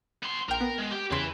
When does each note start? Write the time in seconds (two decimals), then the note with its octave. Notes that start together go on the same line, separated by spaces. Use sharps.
0.23 B3 C6
0.49 A#1 A#4 G5
0.61 B3
0.78 G#3
0.91 G4
1.11 E2 C#3 B4 G#5 C6